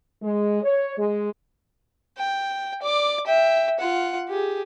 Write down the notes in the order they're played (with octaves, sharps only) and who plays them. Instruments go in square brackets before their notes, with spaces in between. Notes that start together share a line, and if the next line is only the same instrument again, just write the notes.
[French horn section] G#3
C#5
G#3
[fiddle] G5
D5 D6
E5 G5
F4 F#5
G4 G#4